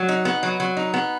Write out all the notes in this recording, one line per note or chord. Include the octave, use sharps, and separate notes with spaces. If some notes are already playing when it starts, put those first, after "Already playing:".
Already playing: F#3
D#4
B3
F#3
F#3
D#4
B3